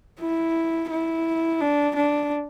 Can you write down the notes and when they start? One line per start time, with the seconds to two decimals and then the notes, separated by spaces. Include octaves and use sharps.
0.20 E4
0.90 E4
1.61 D4
1.95 D4